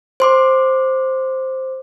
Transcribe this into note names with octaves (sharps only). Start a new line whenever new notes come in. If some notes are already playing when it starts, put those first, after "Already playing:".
C5 C6 D6